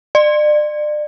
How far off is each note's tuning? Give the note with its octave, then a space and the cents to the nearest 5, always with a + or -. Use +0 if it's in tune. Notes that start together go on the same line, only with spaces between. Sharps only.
D5 +35